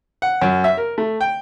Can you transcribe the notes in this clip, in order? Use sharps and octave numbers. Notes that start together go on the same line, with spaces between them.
F#5
F#2
E5
A#4
A3
G5